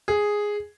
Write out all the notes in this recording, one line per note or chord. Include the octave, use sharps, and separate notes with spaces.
G#4